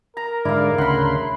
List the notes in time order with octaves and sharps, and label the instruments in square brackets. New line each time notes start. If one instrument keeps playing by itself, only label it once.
[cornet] A#4 [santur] A#5
[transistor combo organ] G#2 D3 D5 [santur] E4 F5
[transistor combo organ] D2 C#3 C6 [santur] F#5 B5